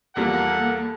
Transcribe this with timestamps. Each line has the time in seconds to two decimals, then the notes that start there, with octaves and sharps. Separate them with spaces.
0.16 E2 F3 G3 A#3 A4 F#5